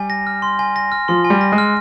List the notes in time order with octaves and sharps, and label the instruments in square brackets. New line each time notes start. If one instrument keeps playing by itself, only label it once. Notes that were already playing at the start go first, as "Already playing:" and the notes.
Already playing: [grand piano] G3 [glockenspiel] G#5
[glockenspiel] A#6
F6
C6
G#5
A#6
F6
[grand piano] F3 [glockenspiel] C6
[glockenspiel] G#5
[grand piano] G3
[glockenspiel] A#6
[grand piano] G#3
[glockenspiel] F6